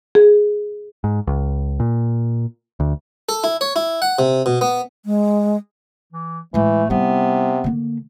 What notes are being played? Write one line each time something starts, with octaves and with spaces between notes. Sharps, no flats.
G#4
G#2
C#2
A#2
D2
A4
E4
C#5
E4
F#5
C3
B2
B3
G#3
E3
A2 E3 G#3 A3
C3 G3 B3 E4
D3 A#3